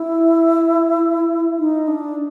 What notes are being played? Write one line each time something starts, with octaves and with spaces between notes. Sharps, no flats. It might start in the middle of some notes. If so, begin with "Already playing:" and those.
Already playing: E4
D#4
D4